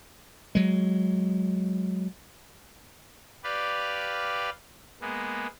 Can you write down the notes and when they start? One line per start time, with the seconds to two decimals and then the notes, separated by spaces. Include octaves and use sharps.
0.55 F#3 G#3
3.44 G4 B4 D5 F5
5.01 G#3 A#3 B3